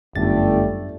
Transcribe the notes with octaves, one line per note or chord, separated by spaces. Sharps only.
G1 F#2 G3 A3 A6